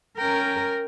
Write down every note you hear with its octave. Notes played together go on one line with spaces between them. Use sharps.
C#4 A#4 G5